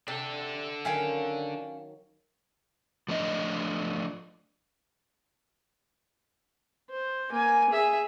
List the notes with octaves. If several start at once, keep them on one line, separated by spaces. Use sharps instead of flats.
C3 D4 A4
D#3 F#3 C#4 F5 G5
F3 A3 D4 D#5
C5
A#3 G#5
G#4 E5